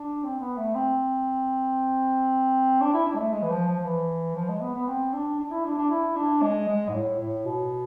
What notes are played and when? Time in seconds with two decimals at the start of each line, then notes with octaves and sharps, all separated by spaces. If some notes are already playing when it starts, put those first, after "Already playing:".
Already playing: D4
0.24 C4
0.40 B3
0.58 A3
0.75 C4
2.82 D4
2.94 E4
3.07 D4
3.14 G#3
3.19 A3
3.33 G#3
3.42 E3
3.50 F3
3.67 F3
3.84 E3
4.35 F3
4.49 G#3
4.61 B3
4.75 B3
4.87 C4
5.13 D4
5.39 D4
5.51 E4
5.65 D4
5.78 D4
5.90 E4
6.16 D4
6.42 G#3
6.68 G#3
6.89 G#2
6.94 A2
7.19 A2
7.45 B2